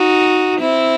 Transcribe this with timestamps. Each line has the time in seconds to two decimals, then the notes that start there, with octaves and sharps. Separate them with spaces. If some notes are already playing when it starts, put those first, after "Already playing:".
Already playing: D#4 F#4
0.60 C4 E4